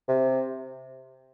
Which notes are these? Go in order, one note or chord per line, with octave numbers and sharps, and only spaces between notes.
C3